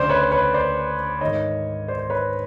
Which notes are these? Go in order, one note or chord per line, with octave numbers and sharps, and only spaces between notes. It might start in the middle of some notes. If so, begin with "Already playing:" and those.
Already playing: D2 C#3 E3 C5 D5
B4 C#5
B4 C#5
C5 D5
G#2 D#3 C#5 D#5
C5 D5
C5
B4 C#5